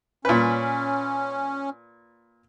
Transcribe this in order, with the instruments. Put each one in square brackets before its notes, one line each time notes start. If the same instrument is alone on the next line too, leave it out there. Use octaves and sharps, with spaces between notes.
[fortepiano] A#2 B4 [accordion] C#4